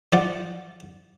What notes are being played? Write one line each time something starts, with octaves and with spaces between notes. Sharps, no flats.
F3 D5 F#5